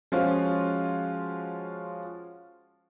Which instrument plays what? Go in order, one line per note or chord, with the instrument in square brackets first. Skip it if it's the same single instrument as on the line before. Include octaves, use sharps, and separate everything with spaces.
[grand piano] F3 G#3 C#4 F4 F#4